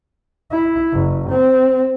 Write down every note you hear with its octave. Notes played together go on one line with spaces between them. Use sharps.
E4
F#1
C4